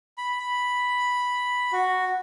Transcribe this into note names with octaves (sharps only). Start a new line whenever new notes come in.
B5
B5
F#4